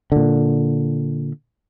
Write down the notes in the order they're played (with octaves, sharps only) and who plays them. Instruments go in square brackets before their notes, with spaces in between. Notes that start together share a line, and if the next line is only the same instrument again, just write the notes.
[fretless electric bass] A#2 D3